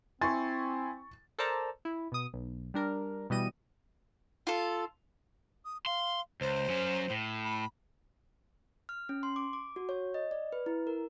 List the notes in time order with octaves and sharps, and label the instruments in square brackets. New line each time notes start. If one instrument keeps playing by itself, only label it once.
[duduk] C4 [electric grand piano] E4 G#5 C6 [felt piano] C#6 A6
[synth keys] A4 A#4 C5 D5 A5 A#5
E4
B2 D#6
B1
G3 D4 A#4
B2 E3 G3 D#5 D#7
[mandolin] F4 A4
[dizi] D#6
[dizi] F5 [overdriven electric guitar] C6
[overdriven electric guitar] C#2 [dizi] C5
[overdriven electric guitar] F#3 C#4
A2
[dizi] B5
[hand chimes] F6
C#4
C6
D6
D6
F#4
C#5
D#5
D5
B4
E4
A#4